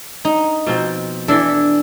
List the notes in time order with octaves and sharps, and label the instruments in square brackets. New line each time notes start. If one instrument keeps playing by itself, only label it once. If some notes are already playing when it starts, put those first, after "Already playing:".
[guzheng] D#4
[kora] B2 F3 C4
[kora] E3 E4 A4 [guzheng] D4